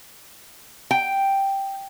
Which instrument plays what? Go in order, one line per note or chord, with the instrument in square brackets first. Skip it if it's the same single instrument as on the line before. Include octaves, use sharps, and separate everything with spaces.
[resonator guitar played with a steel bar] G5